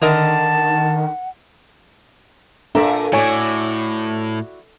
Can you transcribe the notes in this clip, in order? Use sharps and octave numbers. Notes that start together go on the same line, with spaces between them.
D3 D#3 A#4 D#5 F#5 A5
A#2 D4 A4 D5 E5 A#5
A2 E4 F#4 C#5 D5 G#5